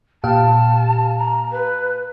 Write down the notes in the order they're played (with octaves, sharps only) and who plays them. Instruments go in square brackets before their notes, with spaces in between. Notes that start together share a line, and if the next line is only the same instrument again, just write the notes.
[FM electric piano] A#2 G4 F5 [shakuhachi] A5
[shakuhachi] A#5
B4